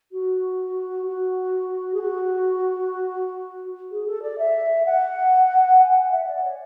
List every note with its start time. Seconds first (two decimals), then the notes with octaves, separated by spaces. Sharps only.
0.12 F#4
1.06 F#4
1.94 G#4
2.01 F#4
3.91 G#4
4.07 A4
4.22 D5
4.38 E5
4.86 F#5
5.80 G#5
5.96 F#5
6.11 E5
6.27 D5
6.44 C#5